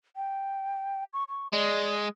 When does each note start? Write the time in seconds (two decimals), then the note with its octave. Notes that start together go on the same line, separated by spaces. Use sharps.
0.16 G5
1.13 C#6
1.29 C#6
1.53 G#3 D5